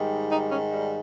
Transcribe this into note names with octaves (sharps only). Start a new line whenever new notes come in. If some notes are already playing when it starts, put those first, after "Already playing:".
Already playing: G#2 D#3 G3
D#4
C#4
G3